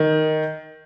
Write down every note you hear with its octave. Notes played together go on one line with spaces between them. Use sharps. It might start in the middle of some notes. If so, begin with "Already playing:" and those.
Already playing: D#3